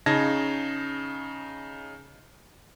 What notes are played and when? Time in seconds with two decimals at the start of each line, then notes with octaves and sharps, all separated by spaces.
0.06 C#3 D#4 A5 G#6 A#6